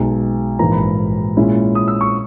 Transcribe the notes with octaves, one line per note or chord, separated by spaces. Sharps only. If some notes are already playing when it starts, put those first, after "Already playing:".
Already playing: B1 B2 G#3 D#4
A#1 G#2 E3 A#3 A#5
B5
A#2 G#3 C#4 E4
D#6
E6
C#6